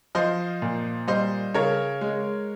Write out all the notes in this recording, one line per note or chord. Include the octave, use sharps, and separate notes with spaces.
F3 C5 D#5
A#2
G3 C5 D#5
C#3 A#4 C#5
G#3